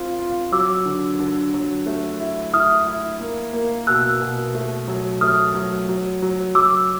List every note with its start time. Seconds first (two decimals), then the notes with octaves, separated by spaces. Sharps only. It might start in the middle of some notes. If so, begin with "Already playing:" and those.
Already playing: C4 F4
0.19 F4
0.52 F#3 D6 E6
0.85 D3
1.19 D3
1.54 F#3
1.86 A3
2.20 E4
2.54 E4 D#6 F6
2.87 E4
3.20 A#3
3.53 A#3
3.87 B2 E6 F#6
4.21 B2
4.55 A3
4.88 F#3
5.21 A3 D#6 F6
5.55 F#3
5.89 F#3
6.22 F#3
6.55 F#3 D6 E6